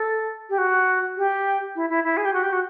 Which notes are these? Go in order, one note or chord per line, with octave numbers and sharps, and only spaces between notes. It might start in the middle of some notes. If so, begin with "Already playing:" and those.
Already playing: A4
G4
F#4
G4
E4
E4
E4
G#4
G4
F#4
G4
F#4